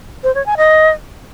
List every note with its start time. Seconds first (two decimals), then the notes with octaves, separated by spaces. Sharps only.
0.23 C5
0.35 C#5
0.46 G#5
0.57 D#5